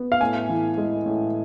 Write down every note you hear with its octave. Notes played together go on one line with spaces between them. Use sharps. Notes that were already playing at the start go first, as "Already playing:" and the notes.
Already playing: B3
F5
A2 G#5
E3
G#3
A2